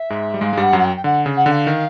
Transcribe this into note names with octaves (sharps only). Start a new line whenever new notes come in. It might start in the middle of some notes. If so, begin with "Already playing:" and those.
Already playing: E5
G#2 G#3
G3
G#2 G#3 F5
G#3
G2 G3 F#5
F#2 F#3
F#5
G5
G5
D3 F#5
C#3
F#5
D3 F5
D#3